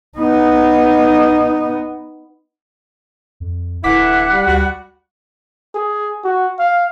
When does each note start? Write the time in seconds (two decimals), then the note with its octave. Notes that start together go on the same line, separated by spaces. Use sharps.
0.18 B3 D#4
3.40 F2
3.84 D1 D3 E3 E4 F#5 D6 B6
4.31 G3
4.46 D2 G3 F#4
5.74 G#4
6.24 F#4
6.59 F5